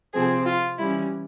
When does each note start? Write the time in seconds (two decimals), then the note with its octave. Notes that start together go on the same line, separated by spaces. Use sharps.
0.13 C3 F3 C4 G#4
0.46 F4
0.78 E3 G3 C#4 E4